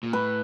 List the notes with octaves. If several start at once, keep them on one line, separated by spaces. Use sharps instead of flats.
A#2
A2 B4